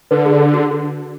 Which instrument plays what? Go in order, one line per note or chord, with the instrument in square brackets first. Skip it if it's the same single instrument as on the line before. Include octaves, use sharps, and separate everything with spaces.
[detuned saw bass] D3 [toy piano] B4
[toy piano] G#4
F#4